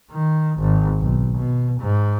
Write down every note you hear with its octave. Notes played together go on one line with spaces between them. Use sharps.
D#3
G#1
B1
B2
G#2